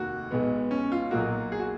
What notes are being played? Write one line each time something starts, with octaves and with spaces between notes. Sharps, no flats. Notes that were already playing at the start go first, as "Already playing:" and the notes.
Already playing: F1 D#2 D#3 A#3 F#4
B1 B2 G#3 B3
C#4
F4
B1 A#2 F#3 A#3 F#4
G#4
F#4